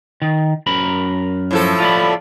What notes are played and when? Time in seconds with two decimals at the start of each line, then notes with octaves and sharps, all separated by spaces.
0.22 D#3
0.67 F#2 A#4 B5
1.51 A2 F3 A4
1.80 F4 D5 B5